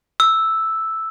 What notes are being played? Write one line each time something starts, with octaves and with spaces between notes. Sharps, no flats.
E6